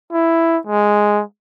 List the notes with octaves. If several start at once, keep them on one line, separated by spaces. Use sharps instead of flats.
E4
G#3